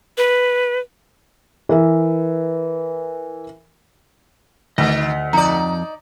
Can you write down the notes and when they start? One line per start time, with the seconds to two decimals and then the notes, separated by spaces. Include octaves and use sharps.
0.18 B4
1.69 E3 A#4 E5
4.78 D2 D#3 D#5
5.33 F2 D#4 D5 A#5